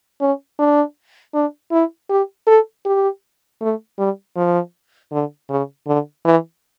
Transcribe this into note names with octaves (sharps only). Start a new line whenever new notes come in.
C#4
D4
D4
E4
G4
A4
G4
A3
G3
F3
D3
C#3
D3
E3